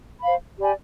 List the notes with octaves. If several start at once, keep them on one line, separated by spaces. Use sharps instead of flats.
C5 F5 B5
G4 D5 G#5 B5